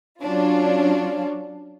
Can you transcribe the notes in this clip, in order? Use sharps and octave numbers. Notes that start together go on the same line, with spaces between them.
F#3 C#4 D4 F4